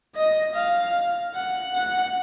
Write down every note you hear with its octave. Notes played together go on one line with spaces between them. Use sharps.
D#5
F5
F#5
F#5